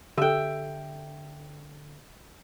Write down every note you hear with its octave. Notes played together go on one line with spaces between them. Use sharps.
D3 G4 A4 E5 G5